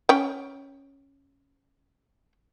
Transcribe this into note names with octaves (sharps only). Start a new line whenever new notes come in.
C#4 G5